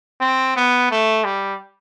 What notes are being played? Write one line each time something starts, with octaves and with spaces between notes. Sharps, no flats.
C4
B3
A3
G3